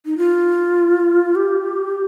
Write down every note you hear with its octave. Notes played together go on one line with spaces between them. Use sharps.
D#4
F4
G4